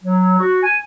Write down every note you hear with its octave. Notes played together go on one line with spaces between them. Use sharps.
F#3
F#4
G#5